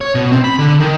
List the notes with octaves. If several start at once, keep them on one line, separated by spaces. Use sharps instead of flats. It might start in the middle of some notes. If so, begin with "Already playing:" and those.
C#5
B2
C4
B5
D3
D#3